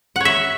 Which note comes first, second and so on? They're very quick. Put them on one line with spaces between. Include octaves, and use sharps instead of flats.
F#5 C#5 E5